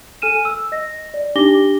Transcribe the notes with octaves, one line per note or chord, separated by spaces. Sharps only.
A4 G#5 F6 D#7 E7
E6
D#5 A#6
D5
D4 D#4 G4 D6 A#6 G7